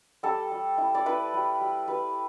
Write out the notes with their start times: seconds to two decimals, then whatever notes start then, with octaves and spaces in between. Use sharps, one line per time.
0.23 G3 A4
0.52 G3
0.78 E4
0.95 D5
1.06 E4 B4
1.34 G3
1.61 G3
1.88 G3 B4